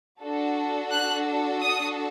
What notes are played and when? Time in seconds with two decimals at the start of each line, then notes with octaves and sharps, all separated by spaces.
0.21 D4 F#4 A4
0.91 F#6
1.61 D#6